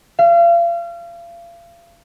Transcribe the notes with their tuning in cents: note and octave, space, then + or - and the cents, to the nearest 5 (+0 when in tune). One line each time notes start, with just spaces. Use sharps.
F5 -35